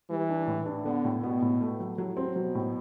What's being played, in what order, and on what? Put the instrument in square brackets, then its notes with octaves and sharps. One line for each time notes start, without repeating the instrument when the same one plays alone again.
[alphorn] E3 [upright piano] G3
[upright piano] D4
A2
D4
[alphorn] D3 [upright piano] B3
[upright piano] A2
[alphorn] B2 [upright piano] B3
[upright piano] A2
A3
F#3
[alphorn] A2 [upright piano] F#3
[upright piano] C4
[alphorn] B2 [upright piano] F#3
[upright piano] A2